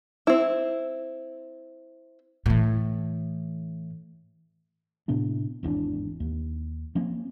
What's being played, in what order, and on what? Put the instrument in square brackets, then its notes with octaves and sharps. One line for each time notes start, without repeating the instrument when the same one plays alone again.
[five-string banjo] C4 E4
[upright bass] A2 E3
[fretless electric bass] A2 C3 B3 D4
G#1 E2 C4 D4
D#2
F3 A#3 C4 C#4